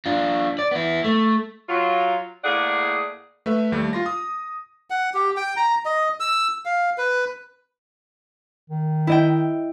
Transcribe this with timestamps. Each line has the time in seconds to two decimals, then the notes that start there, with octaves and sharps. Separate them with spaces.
0.06 D4 F4
0.59 D5
0.71 B3 E4
1.04 A3
1.69 F#3 F4
2.44 A2 A#3 G#4 D5 F#5
3.46 A3 B4 E5
3.72 D#2 G3 A3
3.93 F4 C6 A#6
4.06 D#6
4.90 F#5
5.14 G4
5.37 G5
5.57 A#5
5.85 D#5
6.20 E6
6.65 F5
6.98 B4
8.70 D#3
9.07 E4 D#5 G5